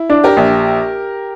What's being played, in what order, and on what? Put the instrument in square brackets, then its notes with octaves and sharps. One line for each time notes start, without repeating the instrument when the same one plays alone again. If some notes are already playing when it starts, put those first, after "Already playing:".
Already playing: [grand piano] E4
[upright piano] D4
[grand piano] G4 A#4
[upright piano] A#1